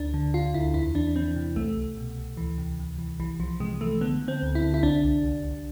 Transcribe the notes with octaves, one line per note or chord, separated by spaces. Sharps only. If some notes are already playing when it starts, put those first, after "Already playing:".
Already playing: D2 D4
D3
D3 F4
D2 E4
E2 E4
E3 D4
E3 C4
C3
C2 A3
C2
B2
C2
D2 E3
C3
C3
E3
C2 E3
C2 F3
C3 G#3
E3 A3
D3 B3
D3
C4
D2
E4
D3
E4
C2 D4
C2
C2
C2